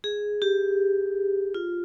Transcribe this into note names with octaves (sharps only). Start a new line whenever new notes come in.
G#4
G4
F4